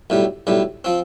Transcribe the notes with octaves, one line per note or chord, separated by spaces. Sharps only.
B1 A2 G3
B1 A2 G3
F3 C4